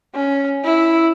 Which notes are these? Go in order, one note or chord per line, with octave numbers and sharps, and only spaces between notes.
C#4
E4